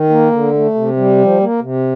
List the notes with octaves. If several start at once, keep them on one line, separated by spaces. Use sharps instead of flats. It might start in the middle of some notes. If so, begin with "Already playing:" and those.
Already playing: D#3
A#3
D3
A3
C3
G3
F3
A#3
C3